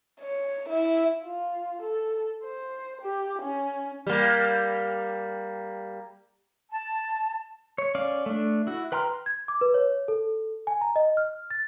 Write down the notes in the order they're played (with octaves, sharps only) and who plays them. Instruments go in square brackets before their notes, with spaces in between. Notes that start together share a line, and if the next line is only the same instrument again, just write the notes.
[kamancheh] C#5
E4
F4
A4
C5
G4
C#4
[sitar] G3 A#3
[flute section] A5
[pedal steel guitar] C#5
C#4 D5 F5
A3 D4
E4 F#4
B4 G5 A#5 C6 F6
[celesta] G#6
D6
B4
C#5
A4
G#5
A#5
D#5
F6
A6